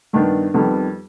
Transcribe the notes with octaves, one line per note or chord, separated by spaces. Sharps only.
G2 D#3 B3 D4
F2 D#3 G3 B3